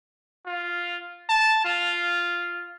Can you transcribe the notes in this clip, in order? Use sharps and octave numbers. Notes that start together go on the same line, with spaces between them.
F4
A5
F4